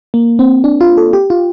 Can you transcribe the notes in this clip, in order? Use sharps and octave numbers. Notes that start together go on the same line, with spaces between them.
A#3
C4
D4
F4
A4
G4
F4